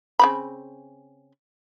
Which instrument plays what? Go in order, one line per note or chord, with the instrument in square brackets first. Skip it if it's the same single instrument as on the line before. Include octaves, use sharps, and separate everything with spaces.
[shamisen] C#3 C4 B5